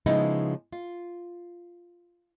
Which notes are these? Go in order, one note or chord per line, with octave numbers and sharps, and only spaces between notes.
C#3 F3 G#3 B3 D#4 E4
F4